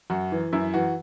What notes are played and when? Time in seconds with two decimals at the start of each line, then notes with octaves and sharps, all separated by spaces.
0.10 F#2 F#4
0.32 E3
0.53 F#2 E4
0.74 E3 F#4